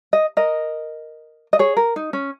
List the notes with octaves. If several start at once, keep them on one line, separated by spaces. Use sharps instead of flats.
D#5
A#4 D#5
D#5
G#4 C#5
A#4
D#4
C#4